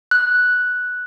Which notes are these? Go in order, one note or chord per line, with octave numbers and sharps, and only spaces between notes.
F#6